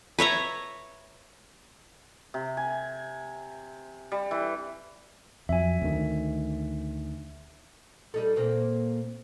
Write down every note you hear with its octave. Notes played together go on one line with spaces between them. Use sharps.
B4 C#5 E5 A#5
C3
G#5
G3
E3
F2 F#3 E5 G#5
D2 D#3
G3 D#4 A4
A#2 A#3 C4